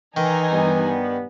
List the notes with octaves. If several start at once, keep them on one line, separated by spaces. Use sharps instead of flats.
D#3 E3 D#4 G#5
G2 G3 B3